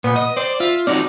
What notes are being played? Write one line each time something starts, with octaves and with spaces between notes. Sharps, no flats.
A#2 B3
D#5
C5 D5
F4 E5
C4 D#4 F#4 D5